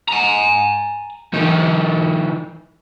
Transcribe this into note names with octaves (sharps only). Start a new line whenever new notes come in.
G#5 A#5
E3 D#4